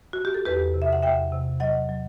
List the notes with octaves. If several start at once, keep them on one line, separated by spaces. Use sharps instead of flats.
F#4
G4
A4
E2 G4 B4
C3
E5
F#5
E2 E5 G5
C3
F#3 D#5 F#5
F#3